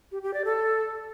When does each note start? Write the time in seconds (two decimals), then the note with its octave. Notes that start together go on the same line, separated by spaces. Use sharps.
0.12 G4
0.23 G4
0.34 D5
0.45 A4